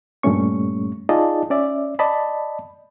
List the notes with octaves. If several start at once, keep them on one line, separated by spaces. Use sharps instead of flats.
G2 A#2 G3 A3 C#4 C#6
D#4 F4 G#4 D5 D#5 A5
C#4 D5 E5
D5 D#5 A5 B5